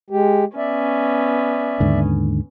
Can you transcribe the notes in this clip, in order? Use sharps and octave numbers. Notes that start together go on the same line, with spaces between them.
G#3 G4
B3 C#4 D5 E5
D#2 G#2 D3